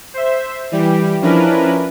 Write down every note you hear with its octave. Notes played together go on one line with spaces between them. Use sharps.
C5 E5
E3 G3 G4
F3 C#4 D4 E4 A#4 B4